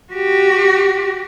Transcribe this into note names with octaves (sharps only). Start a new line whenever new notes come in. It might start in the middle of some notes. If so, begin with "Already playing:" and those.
F#4 G4